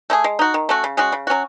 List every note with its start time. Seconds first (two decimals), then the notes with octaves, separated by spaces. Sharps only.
0.10 A3 D#4 G#4
0.24 G#3
0.39 D#4 F#4
0.54 D#3
0.69 A3 C#4 F#4
0.84 C#3
0.97 G#3 C#4 F#4
1.12 C#3
1.27 F#3 C#4 F#4